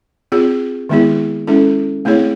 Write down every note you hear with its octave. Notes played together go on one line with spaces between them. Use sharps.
C4 F4 G#4
D#3 G#3 B3 E4 G#4
G#3 C#4 E4 A4
A3 C4 E4 G#4 C#5